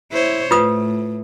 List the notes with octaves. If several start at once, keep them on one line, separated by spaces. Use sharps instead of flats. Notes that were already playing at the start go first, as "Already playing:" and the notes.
E4 C5 C#5
A2 F4 B4 D#6